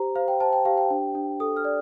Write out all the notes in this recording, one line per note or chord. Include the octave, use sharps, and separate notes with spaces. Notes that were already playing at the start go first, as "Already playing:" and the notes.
Already playing: G4 C5 A#5
C5 F5
G5
C5 A5
G5
G4 F5
G5
D4
D4
A4 D#6
F6
D5